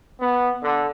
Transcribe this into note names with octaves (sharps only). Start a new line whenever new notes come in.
B3
D3